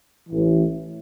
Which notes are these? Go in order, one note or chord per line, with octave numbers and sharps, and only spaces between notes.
A1 A2 E3